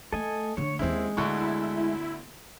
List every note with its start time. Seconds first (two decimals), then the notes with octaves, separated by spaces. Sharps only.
0.13 A3 A4 D#5 G#5
0.57 D3 A3 C#5
0.79 D#2 G#3 C4 C#4 E4
1.17 D2 B3 E4 F#5 C#6